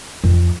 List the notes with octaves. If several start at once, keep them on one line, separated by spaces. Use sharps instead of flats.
F2